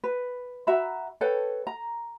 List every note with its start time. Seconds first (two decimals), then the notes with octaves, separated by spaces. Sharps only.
0.04 B4
0.67 F#4 E5 A#5 B5
1.21 A4 B4 C#5 G5
1.67 A#5